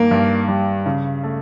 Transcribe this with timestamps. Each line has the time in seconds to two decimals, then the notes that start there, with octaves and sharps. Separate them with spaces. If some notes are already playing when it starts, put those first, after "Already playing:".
Already playing: G2 D#3 A#3
0.11 G2
0.48 G3
0.86 C#3
1.23 A3